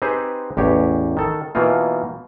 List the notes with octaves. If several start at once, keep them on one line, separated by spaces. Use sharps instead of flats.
C4 D#4 G4 G#4 B4 C5
A1 E2 G4 C#5
D#3 A4
B2 E3 A#3 D#4 F4